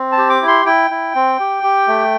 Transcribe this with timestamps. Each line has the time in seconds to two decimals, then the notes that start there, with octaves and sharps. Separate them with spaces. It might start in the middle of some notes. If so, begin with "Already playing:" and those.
Already playing: C4
0.12 A5
0.17 G4
0.30 D6
0.42 E4
0.48 C6
0.66 E4 G5
0.91 E4
1.15 C4
1.40 G4
1.64 G4
1.88 A3